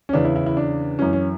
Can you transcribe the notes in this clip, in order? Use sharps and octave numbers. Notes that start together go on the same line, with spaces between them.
C#4
E2 C#3 E3 D4
E4
E4
E4
D4
F#2 E3 C#4
C#4